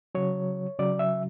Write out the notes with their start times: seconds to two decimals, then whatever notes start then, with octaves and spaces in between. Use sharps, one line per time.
0.15 C#3 F#3 C#5
0.79 C#3 F#3 D5
0.99 E5